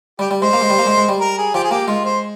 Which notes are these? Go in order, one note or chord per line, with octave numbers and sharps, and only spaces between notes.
G3 G4
G3
G#3 C5
A#3
G#3
G3
A#3
G#3
G#3
G3
A#4
G#4
F3 G4
G#4
A#3 G4
G#3 F4
C5